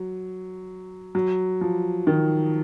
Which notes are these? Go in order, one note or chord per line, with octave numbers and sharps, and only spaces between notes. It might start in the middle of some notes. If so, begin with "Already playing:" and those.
Already playing: F#3
F#3
F3
D#3